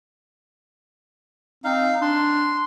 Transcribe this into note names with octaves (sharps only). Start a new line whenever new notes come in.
C4 D#4 F5
D4 C6